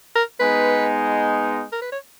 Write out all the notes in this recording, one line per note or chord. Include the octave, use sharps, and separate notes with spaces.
A#4
G#3 B3 D#4 B4
A#4
B4
C#5